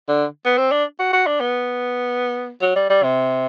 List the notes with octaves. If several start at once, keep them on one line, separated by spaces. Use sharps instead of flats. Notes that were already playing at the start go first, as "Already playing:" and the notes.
D3
B3
C4
D4
F#4
F#4
D4
B3
F#3
G3
G3
C3